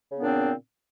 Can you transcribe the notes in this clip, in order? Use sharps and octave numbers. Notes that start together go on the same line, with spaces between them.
A#2 C#3 B3 C4 D4